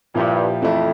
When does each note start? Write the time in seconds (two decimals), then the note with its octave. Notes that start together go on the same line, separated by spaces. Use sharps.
0.15 G2 A#2 F3 A#3 E4 G4
0.62 F2 E3 A3 E4